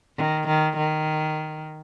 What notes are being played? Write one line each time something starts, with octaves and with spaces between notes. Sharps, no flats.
D#3
D#3
D#3